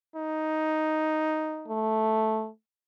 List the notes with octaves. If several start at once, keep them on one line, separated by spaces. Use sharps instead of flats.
D#4
A3